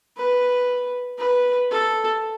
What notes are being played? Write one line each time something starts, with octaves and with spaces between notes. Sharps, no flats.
B4
B4
A4